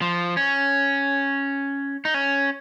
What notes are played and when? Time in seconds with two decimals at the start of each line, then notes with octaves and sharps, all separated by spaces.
0.02 F3
0.37 C#4
2.05 D#4
2.14 C#4